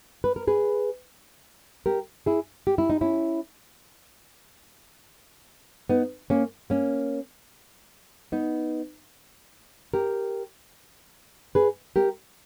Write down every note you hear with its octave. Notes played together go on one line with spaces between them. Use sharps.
B4
A#4
G#4 B4
G4 A#4
E4 G#4
G4
E4
D#4
C#4 E4
B3 D#4
A#3 C#4
A#3 C#4
B3 D#4
G4 A#4
G#4 B4
G4 A#4